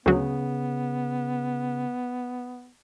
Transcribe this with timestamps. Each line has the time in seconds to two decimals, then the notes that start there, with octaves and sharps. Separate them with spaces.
0.06 D2 C#3 F#3 B3